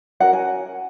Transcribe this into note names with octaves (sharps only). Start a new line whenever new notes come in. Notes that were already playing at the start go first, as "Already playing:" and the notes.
C#4 F#4 A#4 F#5
G#5